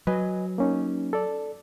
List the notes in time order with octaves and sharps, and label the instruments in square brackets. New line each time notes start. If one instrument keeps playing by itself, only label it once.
[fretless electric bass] F#3 [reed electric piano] B4 D#5 G#5
[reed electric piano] A#3 C#4 D#4
A4 D5